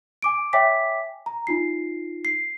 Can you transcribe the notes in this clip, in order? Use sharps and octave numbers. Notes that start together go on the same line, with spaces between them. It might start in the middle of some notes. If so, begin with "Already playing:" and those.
G#5 D6 D7
C#5 E5 G5 G#5 D6 B6
A#5
D#4 F4 C7
C7